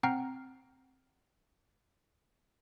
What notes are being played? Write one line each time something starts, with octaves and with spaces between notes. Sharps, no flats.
C4 F#5 G5 A#5 F6 C7